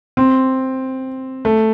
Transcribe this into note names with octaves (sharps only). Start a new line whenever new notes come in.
C4
A3